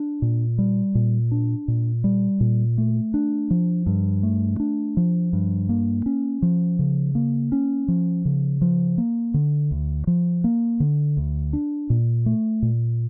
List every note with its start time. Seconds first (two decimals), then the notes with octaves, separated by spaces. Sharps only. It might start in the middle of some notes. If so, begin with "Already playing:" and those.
Already playing: D4
0.22 A#2
0.58 G3
0.95 A#2
1.31 D4
1.68 A#2
2.04 G3
2.40 A#2
2.78 A3
3.14 D4
3.51 F3
3.86 G2
4.23 A3
4.60 D4
4.97 F3
5.33 G2
5.69 A#3
6.06 C#4
6.42 F3
6.79 C#3
7.15 A#3
7.52 C#4
7.88 F3
8.25 C#3
8.62 F3
8.98 A#3
9.34 D3
9.71 D2
10.07 F3
10.44 A#3
10.80 D3
11.17 D2
11.53 D4
11.90 A#2
12.26 A3
12.62 A#2